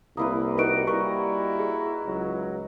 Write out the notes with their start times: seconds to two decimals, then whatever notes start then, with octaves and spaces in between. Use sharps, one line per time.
0.17 C2 A#3 E4 B4 D#6
0.58 D#4 F#4 A#4 B4 D#5 D7
0.87 G3 E4 A#4 C#6
1.59 G#4
2.06 C#2 F#3